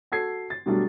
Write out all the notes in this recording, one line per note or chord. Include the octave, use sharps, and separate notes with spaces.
F#4 A4 G#6 C7
A6
B2 F#3 G3 A3 D4